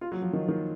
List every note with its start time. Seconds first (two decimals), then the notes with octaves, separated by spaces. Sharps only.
0.01 F4
0.12 F#3
0.22 F3
0.33 D#3
0.48 D#3